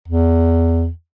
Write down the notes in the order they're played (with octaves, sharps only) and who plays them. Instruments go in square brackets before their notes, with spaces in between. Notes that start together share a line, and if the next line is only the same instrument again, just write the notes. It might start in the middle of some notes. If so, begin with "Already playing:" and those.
[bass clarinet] E2